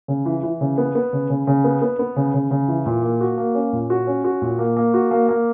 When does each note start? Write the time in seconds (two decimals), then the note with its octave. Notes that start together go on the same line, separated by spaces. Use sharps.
0.08 C#3
0.26 E3
0.43 E3
0.61 C#3
0.78 B3
0.95 B3
1.13 C#3
1.30 C#3
1.47 C#3
1.64 B3
1.82 B3
1.99 B3
2.16 C#3
2.34 C#3
2.51 C#3
2.68 E3
2.86 A#2
3.03 A#3
3.21 F#4
3.38 A#3
3.55 C#4
3.73 A#2
3.90 F#4
4.07 C#4
4.24 F#4
4.42 A#2
4.59 A#3
4.77 A#3
4.94 F#4
5.11 A#3
5.29 A#3